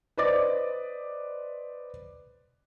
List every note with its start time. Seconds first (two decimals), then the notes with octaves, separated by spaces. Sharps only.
0.17 B4 C5 D5 D#5 D6 A6